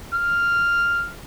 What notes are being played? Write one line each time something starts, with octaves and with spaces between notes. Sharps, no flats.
F6